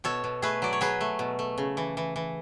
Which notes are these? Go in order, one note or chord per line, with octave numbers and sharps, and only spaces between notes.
B2 A4 C#5
B2
A3 G#4 B4
F#3 D5
C#5
F#3 G#4 B4
A3
B2
A3
C#3
E3
E3
E3